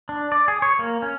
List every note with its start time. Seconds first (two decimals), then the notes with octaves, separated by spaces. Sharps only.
0.09 D4
0.32 D5
0.48 G#4
0.62 C#5
0.79 A#3
1.02 C#4